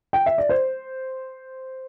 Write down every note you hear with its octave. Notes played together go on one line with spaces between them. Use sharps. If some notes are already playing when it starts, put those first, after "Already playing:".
G5
E5
D5
C5